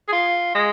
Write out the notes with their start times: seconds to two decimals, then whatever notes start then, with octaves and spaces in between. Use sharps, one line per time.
0.08 G#4
0.12 F4
0.55 G#3